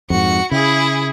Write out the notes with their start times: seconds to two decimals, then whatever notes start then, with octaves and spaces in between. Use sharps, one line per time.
0.10 F2 G#2 F#4 C#7
0.51 C#3 E4 G#4